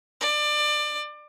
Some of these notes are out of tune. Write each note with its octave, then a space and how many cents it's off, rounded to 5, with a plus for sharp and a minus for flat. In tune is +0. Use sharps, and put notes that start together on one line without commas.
D5 +25